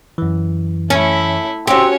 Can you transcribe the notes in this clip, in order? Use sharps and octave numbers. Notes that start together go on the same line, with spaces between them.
F#2 E3
A3 C#4 E4
C4 C#4 F#4 G4 C#5